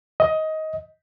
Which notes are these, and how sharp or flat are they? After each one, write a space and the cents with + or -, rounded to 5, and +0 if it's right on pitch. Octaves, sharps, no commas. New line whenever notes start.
D#5 +15